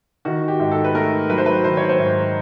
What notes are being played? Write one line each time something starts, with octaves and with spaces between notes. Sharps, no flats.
D#3 F#4
G4
G#2
A4
B4
A3 A#4
F#3 B4
C5
B4
D#3 C5
C#5
C5
G#2